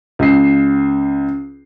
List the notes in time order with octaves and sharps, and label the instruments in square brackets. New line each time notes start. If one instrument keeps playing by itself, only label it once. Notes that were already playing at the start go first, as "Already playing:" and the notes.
[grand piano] C#2 C7